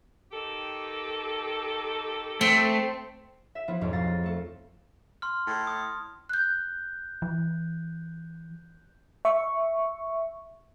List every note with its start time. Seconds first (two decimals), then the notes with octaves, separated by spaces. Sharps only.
0.32 D#3 G4 A4
2.41 A3 C4
3.55 E5
3.68 F3 B3 E4 B4
3.81 B1 F2 G#2 F#3 G#3
3.93 F5 A#5 A6
4.08 F4
4.23 A3 A4
5.22 C6 F6
5.47 A2
5.67 D#6
6.29 F#6 G6
7.22 E3
9.25 E5 C#6